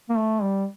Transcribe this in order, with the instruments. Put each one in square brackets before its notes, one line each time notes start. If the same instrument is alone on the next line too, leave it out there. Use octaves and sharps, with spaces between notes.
[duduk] A#3
A3
G3